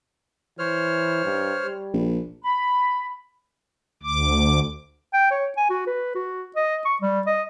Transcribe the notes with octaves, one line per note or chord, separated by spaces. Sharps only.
E3 C5 C#5 F6
G2
G3
A#1
B5
D2 D6
G5
C#5
G#5
F#4
B4
F#4
D#5
C#6
G3
D#5